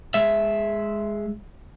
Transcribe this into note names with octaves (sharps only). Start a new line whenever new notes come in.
G#3 E5